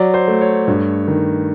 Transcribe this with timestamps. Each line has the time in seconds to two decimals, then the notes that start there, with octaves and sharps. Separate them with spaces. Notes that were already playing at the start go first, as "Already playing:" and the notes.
Already playing: F#3 D5
0.14 C5
0.28 A3
0.41 C#5
0.68 G2
1.07 D#3